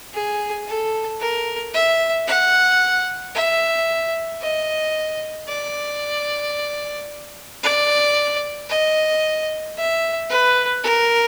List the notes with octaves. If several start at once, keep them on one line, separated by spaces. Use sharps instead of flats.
G#4
A4
A#4
E5
F#5
E5
D#5
D5
D5
D#5
E5
B4
A#4